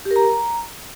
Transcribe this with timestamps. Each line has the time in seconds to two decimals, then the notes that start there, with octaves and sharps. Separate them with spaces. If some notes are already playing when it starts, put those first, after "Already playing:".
0.05 G4
0.11 A#4
0.16 A#5